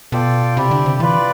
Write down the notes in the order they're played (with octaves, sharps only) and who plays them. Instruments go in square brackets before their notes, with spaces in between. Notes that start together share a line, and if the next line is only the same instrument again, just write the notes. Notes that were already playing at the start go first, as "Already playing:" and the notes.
[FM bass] B2 [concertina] F4 A4 D5 G5
[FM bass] C3 [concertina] E4 G4 D5
[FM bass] D3
C3
[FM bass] E3 [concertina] F4 B4 D5